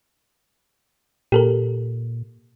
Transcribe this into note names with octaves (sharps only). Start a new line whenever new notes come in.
A#2 G4 A4 A#4